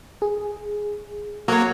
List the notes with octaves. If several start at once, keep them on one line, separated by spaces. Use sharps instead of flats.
G#4
F#3 A#3 C#5